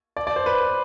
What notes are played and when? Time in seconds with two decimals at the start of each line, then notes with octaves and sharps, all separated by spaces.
0.17 D5
0.27 D5
0.36 C5
0.46 B4